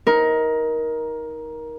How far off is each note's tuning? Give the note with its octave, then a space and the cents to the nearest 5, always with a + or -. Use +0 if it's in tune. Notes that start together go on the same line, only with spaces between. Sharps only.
D#4 +25 A#4 +15